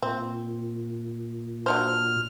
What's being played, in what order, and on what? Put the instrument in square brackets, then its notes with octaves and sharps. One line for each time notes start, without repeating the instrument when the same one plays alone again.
[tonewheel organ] A#2 [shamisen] C4
[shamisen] F#3 D4 C5 [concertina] F6